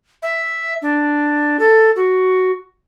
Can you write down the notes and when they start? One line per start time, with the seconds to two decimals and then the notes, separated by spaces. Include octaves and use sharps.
0.22 E5
0.82 D4
1.59 A4
1.96 F#4